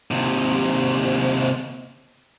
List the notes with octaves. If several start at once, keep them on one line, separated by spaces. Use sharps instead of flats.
D#2 C3